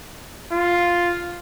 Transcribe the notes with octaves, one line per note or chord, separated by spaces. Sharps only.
F4